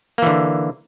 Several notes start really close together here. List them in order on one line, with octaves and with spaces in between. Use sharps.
A#3 E3 D3